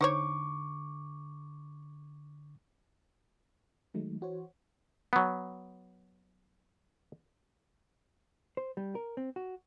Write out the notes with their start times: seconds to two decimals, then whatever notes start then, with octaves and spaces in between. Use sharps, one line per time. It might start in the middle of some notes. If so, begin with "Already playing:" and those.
0.01 D3 D#4 C5 C#5 C#6 D6
3.94 D#3 F#3 G#3 A3 D#4
4.21 E3 F#4 C5 C#5
5.13 F#3 B3
8.57 C5
8.77 G3
8.95 A#4
9.17 C4
9.36 F#4